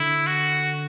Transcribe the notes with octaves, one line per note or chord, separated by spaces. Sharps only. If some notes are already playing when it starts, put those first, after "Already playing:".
Already playing: D3 E4
F#4